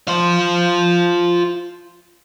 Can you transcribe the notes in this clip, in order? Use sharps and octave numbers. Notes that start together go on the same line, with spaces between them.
F4 C5